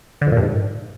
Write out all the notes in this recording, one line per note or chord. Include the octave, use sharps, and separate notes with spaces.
D3
F2
A#2
G2
G#2